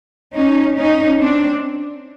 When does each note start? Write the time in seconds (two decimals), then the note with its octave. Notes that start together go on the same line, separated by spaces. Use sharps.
0.35 C#4 D#4
0.77 C#4 D#4
1.19 C4 D4